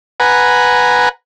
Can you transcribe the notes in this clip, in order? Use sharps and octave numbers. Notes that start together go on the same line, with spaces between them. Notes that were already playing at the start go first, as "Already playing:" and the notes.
B4 F#5 G#5 A#5